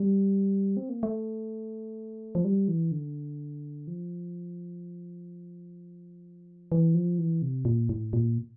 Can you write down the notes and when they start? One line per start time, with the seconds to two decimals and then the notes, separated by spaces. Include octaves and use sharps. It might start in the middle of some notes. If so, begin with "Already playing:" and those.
Already playing: G3
0.77 C4
0.89 A#3
1.03 A3
2.35 F3
2.45 G3
2.68 E3
2.92 D3
3.87 F3
6.72 E3
6.95 F3
7.18 E3
7.42 C3
7.65 A#2
7.89 A2
8.13 A#2